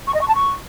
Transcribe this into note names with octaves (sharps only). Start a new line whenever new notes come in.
C#6
D#5
C#6
A5
C#6